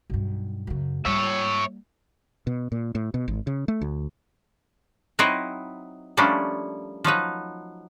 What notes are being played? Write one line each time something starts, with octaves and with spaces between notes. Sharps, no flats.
B1 G2
F#2 C#3
G3 A#3 C#5 E5
B2
A#2
A2
B2
G#1
C#3
A3
D2
F#3 C4 D#4 E4 B4 D#5
F3 G3 A3 A#3 C#4 D4
F3 F#3 D#4 B4